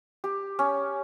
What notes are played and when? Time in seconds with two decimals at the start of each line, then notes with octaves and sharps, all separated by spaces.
0.24 G4
0.59 C#4